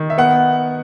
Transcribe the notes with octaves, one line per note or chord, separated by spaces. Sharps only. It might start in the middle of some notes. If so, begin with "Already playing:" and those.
Already playing: D#3
E5
B3 F#5